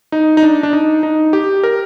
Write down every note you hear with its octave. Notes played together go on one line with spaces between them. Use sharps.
D#4
D#4
D4
D4
D#4
D#4
G4
A#4